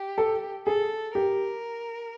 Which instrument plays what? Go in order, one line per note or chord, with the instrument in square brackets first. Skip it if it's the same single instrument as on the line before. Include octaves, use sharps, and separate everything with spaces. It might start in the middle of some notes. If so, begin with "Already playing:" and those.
Already playing: [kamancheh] G4
[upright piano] A4
[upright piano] G#4 [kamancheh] A4
[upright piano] G4 [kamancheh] A#4